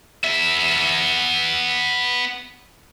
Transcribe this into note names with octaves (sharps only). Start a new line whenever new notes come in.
B3 E5